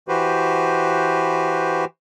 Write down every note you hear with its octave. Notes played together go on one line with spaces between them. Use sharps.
E3 F#4 G4 B4 C5